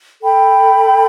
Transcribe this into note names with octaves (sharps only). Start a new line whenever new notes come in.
A4 G5 B5